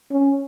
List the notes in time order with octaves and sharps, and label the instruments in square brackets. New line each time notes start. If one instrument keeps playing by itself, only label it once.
[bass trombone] C#4